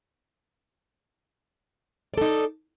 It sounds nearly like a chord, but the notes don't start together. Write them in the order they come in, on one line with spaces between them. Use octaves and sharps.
D5 A4 D#4